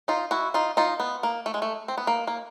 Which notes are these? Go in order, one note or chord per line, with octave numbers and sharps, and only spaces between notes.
D#4 F4
E4 F#4
D#4 F4
D#4 F4
B3
A#3
A3
G#3
A3
C4
B3
A#3
A#3